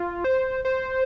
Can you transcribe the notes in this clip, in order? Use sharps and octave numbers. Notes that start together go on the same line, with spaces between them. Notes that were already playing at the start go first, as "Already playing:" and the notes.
Already playing: F4
C5
C5